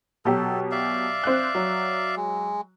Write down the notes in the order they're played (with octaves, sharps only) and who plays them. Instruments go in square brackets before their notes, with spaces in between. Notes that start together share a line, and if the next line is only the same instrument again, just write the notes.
[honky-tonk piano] B2 F#3 G4 [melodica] A4
[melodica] D5 E5 F5
[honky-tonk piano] C4 F#6
F#3
[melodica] G#3